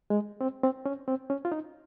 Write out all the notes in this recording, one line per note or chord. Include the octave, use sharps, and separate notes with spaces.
G#3
C4
C4
C#4
C4
C#4
F4
D#4